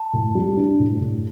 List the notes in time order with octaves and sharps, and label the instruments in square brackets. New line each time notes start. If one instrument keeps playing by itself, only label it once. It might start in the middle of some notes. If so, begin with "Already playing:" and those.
Already playing: [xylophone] A5
[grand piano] A2
G3
D4
A2
A2